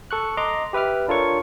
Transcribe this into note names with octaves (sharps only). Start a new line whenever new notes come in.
A4 C#6 F#6
D#5 A#5 C6 D6
G4 B4 E5 D6 F6
D4 F4 A4 A#4 C#5 C#6